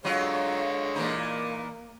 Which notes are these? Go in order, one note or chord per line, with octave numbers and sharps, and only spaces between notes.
D3 F#3 G#3 F4 C#5 F5
A#2 E3 A#3 D#4